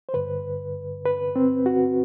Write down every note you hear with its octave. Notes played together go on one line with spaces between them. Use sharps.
C5
G2 D3 B4
B4
C4
F#4